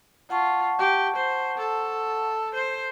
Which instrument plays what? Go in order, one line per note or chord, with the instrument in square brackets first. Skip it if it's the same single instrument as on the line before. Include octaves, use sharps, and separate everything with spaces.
[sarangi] F4 [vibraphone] F#5 A5 C#6
[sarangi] G4
C5
A4
C5